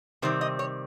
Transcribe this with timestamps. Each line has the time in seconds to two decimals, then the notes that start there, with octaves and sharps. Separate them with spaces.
0.22 C3 D#3 G3 C4 C5
0.41 D#5
0.59 C#5